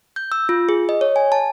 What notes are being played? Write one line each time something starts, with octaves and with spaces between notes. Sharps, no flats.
G6
E6
F4
G#4
D#5
C#5
G#5
A5